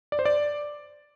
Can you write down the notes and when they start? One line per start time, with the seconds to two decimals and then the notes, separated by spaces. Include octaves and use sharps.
0.12 D5
0.19 C5
0.25 D5